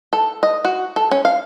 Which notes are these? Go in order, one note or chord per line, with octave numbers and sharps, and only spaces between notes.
A4
D#5
F#4
A4
C#4
F5